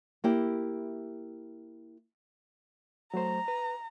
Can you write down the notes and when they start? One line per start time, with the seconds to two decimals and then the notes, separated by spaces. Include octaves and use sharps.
0.24 A#3 E4 G4
3.14 F#3 A3 C5 A#5
3.48 B4